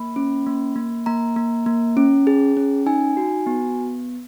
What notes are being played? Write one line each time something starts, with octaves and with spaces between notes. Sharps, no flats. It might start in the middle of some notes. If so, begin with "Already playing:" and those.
Already playing: A#3 B5
C#4
A#3
A#3
A#3 A#5
A#3
A#3
C#4
G#4
C#4
D#4 G#5
F#4
B3